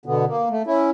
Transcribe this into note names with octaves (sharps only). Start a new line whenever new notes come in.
B2 D3 B3
A#3
A3
C#4 E4